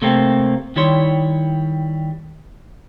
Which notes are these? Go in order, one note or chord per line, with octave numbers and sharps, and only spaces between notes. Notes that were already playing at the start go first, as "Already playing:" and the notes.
C3 A3 A#3 C4
D#3 G3 E4 C#5 C6